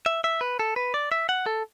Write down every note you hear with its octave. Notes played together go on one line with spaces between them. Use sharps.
E5
E5
B4
A4
B4
D5
E5
F#5
A4